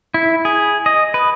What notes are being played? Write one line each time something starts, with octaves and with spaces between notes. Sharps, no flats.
E4
G#4
D#5
B4